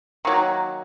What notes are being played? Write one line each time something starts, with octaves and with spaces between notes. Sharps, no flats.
D#3 F#3 A#3